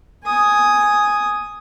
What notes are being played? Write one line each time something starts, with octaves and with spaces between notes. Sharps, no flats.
G#5 D#6